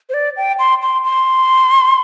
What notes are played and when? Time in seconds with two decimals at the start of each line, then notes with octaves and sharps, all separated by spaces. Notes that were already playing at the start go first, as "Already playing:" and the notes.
0.09 C5
0.14 D5
0.37 G5
0.59 C6
0.82 C6
1.04 C6